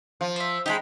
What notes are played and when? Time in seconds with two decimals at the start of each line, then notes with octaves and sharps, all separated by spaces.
0.21 F3
0.36 C5 E5
0.66 G#3 D#4 G4 G#5 B5